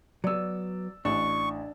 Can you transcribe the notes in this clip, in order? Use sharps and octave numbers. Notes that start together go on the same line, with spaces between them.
F#3 B3 D5 E6
A1 D4 C#6